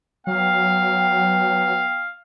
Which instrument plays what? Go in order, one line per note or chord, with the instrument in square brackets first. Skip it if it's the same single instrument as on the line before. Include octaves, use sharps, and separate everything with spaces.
[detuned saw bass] F#3 [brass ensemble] B3 G5 [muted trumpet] F5